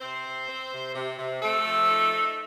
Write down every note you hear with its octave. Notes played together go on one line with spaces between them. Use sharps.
C3 C4 C5
C3
C4
C3
C3
C3
A3 C4 A4
F3
D#4
D#4